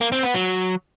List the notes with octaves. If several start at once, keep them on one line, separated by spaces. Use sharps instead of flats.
A#3
C4
B3
F#3